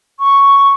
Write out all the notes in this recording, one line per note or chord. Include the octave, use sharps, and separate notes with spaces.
C#6